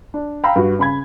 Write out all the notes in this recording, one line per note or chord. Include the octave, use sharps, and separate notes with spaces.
D4
F5 G5 A#5 B5 E6
G2 F#4
C#3 B5 G#6